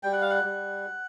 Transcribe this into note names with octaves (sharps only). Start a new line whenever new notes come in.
G3 G5
F#5
F5
F#5
G3